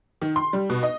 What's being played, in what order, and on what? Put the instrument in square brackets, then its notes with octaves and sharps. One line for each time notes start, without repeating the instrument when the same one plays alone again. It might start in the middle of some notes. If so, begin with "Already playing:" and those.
[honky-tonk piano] D#3
C6
G3
B2
D#5